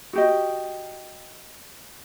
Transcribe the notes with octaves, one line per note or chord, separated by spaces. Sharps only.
F#4 G4 D#5